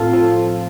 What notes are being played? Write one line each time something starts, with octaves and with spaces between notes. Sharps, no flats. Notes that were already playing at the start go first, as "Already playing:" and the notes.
Already playing: A2 C4 F4 A4
F3